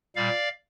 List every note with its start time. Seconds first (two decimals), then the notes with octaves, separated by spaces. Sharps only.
0.16 A#2 G3 D5 F5